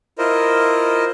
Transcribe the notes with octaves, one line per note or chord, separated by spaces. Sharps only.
E4 F4 A#4 C5 D#5